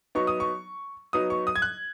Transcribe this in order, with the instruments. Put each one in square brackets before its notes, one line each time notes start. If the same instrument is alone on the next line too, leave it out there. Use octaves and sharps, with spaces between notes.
[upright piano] F#3 B3 D#4 C#6
D#6
C#6
F#3 B3 D#4 D#6
C#6
D#6
G#6
F#6